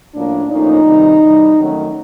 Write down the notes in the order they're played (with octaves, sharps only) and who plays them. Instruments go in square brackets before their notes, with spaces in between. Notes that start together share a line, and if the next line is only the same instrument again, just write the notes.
[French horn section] A2 F3 A#3 C#4 D4
A2 F3 A#3 C#4 D#4
C3 D#3 G3
C3 E3 G3
D#3 F#3 A3 C#4